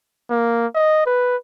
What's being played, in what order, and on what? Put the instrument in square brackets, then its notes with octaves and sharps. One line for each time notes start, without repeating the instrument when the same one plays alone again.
[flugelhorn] A#3
D#5
B4